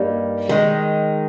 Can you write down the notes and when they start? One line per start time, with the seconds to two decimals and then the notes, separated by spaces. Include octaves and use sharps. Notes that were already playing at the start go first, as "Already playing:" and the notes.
Already playing: G2 G3 A#3 D#4
0.49 D#3 G#3 D#4